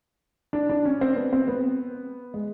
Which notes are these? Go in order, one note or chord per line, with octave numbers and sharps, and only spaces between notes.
D4
D4
C#4
C4
B3
C4
B3
G#3